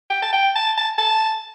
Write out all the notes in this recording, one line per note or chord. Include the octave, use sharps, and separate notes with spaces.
G5
A5
G5
A5
A5
A5